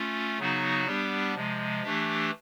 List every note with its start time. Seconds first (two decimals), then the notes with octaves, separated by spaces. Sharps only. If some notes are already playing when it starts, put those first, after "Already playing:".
Already playing: A3 C#4 F4
0.39 C#3 F#3 B3 D#4 F#4
0.86 G3 B3 D4 G4
1.35 C3 F3 G#3
1.83 E3 A3 D4 G4